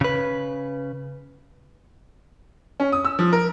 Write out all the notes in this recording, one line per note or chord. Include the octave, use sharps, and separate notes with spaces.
C#3 B4
C#4
D#6
E6
F3
A#4